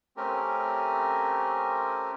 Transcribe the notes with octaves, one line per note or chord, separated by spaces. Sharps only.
A3 C4 C#4 G4 A#4